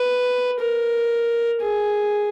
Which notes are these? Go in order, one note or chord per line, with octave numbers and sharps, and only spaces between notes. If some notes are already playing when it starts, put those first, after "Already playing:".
Already playing: B4
A#4
G#4